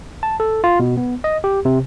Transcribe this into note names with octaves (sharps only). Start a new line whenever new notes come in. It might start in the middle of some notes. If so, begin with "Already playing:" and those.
A5
A4
F4
B2
B3
D#5
G4
C3